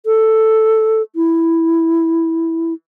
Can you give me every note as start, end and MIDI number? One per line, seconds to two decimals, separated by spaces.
0.06 1.02 69
1.16 2.74 64